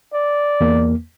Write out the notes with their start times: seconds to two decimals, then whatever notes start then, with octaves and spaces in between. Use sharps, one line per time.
0.13 D5
0.61 E2 A#3